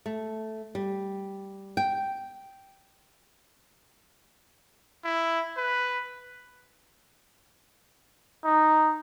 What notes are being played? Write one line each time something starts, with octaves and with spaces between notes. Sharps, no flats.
A3
G3
G5
E4
B4
D#4